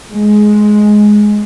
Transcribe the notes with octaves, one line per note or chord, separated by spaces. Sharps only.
G#3